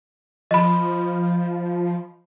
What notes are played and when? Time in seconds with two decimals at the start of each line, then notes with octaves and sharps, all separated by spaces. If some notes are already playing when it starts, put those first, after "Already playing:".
0.51 F3 D#5 B5